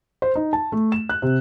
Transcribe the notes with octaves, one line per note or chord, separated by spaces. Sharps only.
C5
D#4
A5
A3
E7
F#6
C3